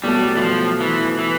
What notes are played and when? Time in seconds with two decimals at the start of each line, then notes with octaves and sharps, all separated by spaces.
0.04 B2 F#3 G3 A3
0.37 E3
0.42 F3
0.81 E3
1.19 E3